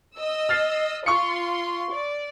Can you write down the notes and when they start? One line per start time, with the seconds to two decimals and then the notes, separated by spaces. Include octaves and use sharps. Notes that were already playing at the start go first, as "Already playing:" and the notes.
0.17 D#5 E6
0.49 F6 A6 C7
1.06 F4 C6 C#6 C#7
1.92 D5